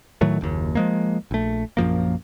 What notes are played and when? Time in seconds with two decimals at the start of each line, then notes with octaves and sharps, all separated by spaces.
0.21 A2 D#3 F#3 A3
0.41 F#1 D#2
0.75 F3 G#3 A#3
1.31 A#1 A3
1.77 A#1 F#2 F3 A#3